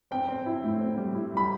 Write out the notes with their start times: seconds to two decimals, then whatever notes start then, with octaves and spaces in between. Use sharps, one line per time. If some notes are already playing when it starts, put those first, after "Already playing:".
0.11 C4 G5
0.28 C4
0.46 E4
0.63 A2
0.81 C4
0.97 G3
1.15 E4
1.32 G3 B5